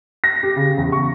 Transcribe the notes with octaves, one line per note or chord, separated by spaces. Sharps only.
A#6
G4
C#3
E2
C#6